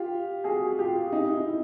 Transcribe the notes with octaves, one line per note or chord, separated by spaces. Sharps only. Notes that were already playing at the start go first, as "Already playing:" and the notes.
Already playing: F4 G4
F#4 G#4
F4 G4
D#4
E4